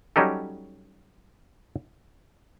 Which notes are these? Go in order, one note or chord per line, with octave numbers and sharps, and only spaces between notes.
F#3 G3 C#4 D#4 G4 A4